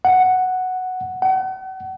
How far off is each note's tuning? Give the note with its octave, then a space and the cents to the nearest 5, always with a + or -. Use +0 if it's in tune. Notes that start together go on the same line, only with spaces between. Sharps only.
F#5 +0
F#5 +40